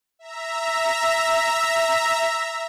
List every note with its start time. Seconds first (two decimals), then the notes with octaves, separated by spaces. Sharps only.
0.19 E5 A#5